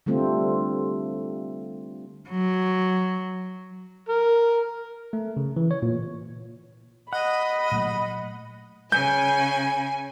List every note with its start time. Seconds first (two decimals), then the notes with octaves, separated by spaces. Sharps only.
0.06 D3 G3 A3 C4 F4
2.30 F#3
4.08 A#4
5.13 A3
5.37 C#3
5.57 E3
5.71 C#5
5.82 A#2
7.13 D#5 F#5 B5
7.71 A#2 F#3 A3
8.92 C#3 G#5 G6